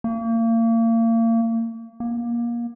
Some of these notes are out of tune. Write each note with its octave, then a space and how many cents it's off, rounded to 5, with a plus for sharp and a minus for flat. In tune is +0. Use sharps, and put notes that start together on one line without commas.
A#3 -35
A#3 +25